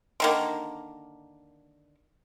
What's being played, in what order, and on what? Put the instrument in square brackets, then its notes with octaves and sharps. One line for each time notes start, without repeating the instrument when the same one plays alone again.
[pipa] D3 D#3 A#3